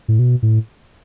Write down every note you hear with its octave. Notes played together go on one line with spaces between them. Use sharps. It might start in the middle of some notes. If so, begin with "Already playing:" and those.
A2
B2
A2